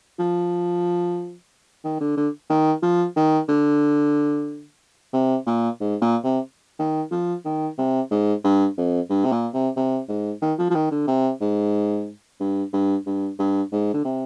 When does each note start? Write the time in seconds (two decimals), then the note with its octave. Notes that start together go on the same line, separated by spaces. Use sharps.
0.19 F3
1.85 D#3
2.01 D3
2.17 D3
2.50 D#3
2.82 F3
3.16 D#3
3.49 D3
5.13 C3
5.46 A#2
5.80 G#2
6.02 A#2
6.24 C3
6.79 D#3
7.11 F3
7.45 D#3
7.78 C3
8.11 G#2
8.44 G2
8.78 F2
9.10 G2
9.25 C3
9.32 A#2
9.54 C3
9.76 C3
10.09 G#2
10.42 D#3
10.59 F3
10.70 F3
10.75 D#3
10.91 D3
11.08 C3
11.41 G#2
12.40 G2
12.73 G2
13.07 G2
13.39 G2
13.72 G#2
13.94 D3
14.05 C3